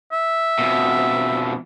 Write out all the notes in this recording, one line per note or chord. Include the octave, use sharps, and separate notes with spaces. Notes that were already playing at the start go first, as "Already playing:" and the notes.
E5
F2 B2